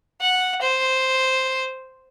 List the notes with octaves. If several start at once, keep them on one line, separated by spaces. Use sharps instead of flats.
F#5
C5